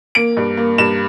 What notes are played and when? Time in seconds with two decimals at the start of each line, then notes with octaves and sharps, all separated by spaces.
0.15 A#3 D7
0.37 G2
0.57 A#3
0.78 G2 E7